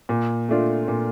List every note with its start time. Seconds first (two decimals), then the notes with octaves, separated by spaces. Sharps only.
0.09 A#2
0.49 A3 D4 F4
0.88 A#2